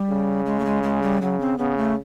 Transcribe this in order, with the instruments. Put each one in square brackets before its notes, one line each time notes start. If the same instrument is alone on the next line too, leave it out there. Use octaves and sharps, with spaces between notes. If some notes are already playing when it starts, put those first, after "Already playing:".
Already playing: [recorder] G3
[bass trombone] C#3
[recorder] G#3
A3
G#3
G#3
G3
[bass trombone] C#3 [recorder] F#3
[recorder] C4
[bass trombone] C#3 [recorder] B3
[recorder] A3